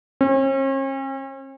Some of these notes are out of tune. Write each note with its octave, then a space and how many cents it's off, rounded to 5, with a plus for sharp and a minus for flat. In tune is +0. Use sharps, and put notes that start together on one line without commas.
C#4 -45